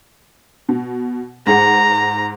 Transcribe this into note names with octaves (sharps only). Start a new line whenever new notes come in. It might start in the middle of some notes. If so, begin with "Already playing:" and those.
B2
G#2 G#4 F#5 A#5